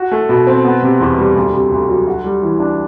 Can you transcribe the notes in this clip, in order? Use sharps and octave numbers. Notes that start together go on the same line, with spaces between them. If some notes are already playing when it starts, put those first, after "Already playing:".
Already playing: F#4
A3
B2
C4
B3
C3
E2
G3
D2
C3
D2
F#3
F#4
G3
E3
D4